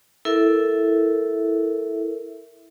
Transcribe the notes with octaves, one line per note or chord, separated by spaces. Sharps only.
E4 A4 A#4 E5